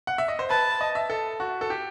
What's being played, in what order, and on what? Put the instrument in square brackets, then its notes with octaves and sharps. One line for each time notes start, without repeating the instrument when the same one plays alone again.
[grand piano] F#5
E5
D#5
C5
[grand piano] B4 [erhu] A5
[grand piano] D#5
E5
A4
F#4
A4
G4